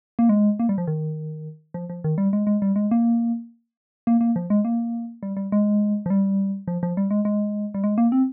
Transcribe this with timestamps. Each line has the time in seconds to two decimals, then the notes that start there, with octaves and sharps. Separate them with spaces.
0.19 A#3
0.29 G#3
0.60 A#3
0.69 G3
0.78 F3
0.87 D#3
1.74 F3
1.90 F3
2.04 D#3
2.18 G3
2.33 G#3
2.47 G#3
2.62 G3
2.76 G#3
2.91 A#3
4.07 A#3
4.21 A#3
4.36 F3
4.50 G#3
4.65 A#3
5.23 G3
5.37 G3
5.52 G#3
6.06 F3
6.10 G3
6.68 F3
6.83 F3
6.97 G3
7.11 G#3
7.25 G#3
7.74 G3
7.84 G#3
7.98 A#3
8.12 C4